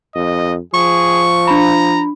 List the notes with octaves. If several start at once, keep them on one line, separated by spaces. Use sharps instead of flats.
F2 D#5
F3 G#4 C#6
D4 A#5 B5